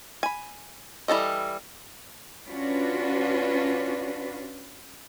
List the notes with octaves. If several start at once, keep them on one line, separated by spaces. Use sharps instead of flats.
G#5 B5
E3 G3 D4 A4 D#5
C#4 D4 F4 F#4 B4